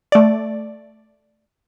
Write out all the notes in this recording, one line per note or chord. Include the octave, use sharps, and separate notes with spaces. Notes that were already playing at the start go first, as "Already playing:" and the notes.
A3 D5